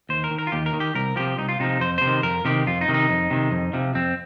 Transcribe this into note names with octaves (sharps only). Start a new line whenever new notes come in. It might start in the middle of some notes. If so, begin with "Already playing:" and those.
D#2 C5
A#4
D#3
A#4
F4
D#2 G4
A#4
D#3
G4
C2 A#4
C3 F3 G4
C2 D#4
F4
C3 F3 D#4
F2 C5
C3 C5
D#3
F2 A#4
C3 D#3 G4
F2 F4
D#4
C3 D#3
D#4
F2
C3 D#3
F2
C3 F3
F2 C4